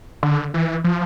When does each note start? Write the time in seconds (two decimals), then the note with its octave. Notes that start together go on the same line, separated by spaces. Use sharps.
0.23 D3
0.54 E3
0.84 F3